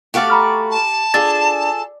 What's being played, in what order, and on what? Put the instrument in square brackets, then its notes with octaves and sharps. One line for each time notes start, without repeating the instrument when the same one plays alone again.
[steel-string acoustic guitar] A3 F#4 F5 [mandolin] G4 D5
[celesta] A#5 B5 F6
[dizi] A5
[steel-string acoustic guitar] D4 [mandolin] F4 G#4 A4 [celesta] A6